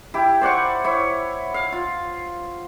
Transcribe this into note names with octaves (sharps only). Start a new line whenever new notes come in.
E4 G4
C5 D5 F#5 C#6
E4 C#5
F5
F4